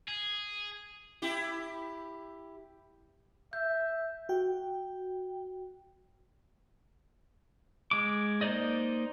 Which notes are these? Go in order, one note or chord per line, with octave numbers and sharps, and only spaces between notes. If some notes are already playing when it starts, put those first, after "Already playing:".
G#4
E4 G4
E5 G6
F#4 G5
G#3 D6
A#3 D#4 C5 D5 D#5